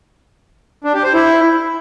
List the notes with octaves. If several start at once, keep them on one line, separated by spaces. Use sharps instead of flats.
D4
G4
C5
E4